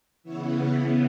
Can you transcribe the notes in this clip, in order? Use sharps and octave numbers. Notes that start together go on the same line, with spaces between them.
C#3 E3 B3 C#5 E5